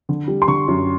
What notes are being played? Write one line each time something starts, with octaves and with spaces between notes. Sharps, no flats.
D3
G3
C6
D3 C#6
F#2